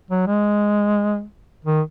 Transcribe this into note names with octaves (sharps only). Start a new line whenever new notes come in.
F#3
G#3
D#3